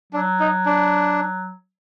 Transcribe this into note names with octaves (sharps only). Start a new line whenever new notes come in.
F#3 D4
D#4
D4